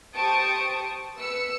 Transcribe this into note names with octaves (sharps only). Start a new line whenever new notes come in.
G4 C5 A5 C#6 D#6 D7
B4 E6 C#7